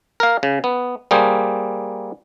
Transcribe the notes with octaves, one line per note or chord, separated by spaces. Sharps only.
A#4 F5
C#3
B3
G3 A#3 G#4 C5